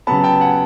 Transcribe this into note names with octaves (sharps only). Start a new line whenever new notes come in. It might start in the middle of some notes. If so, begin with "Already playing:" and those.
C#3 F#3 B3 A5 B5
G5 A5
F#5 G#5